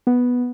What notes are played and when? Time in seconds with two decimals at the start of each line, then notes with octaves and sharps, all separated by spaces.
0.07 B3